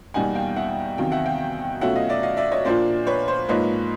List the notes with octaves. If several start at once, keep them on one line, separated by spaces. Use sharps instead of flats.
E2 B2 G3 A#3 D#4 F#5 G#5
F5 G5
E5 F#5
E2 C3 D#3 F#3 F5 G5
E5 F#5
F5 G5
B2 F#3 A3 C#4 F4 E5 F#5
D#5 F5
D5 E5
D#5 F5
D5 E5
C#5 D#5
A#2 F3 A#3 D4 F4 C5 D5
B4 C#5
C5
G#2 F3 A#3 D#4 B4 C#5